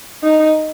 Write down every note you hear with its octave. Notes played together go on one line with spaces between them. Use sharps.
D#4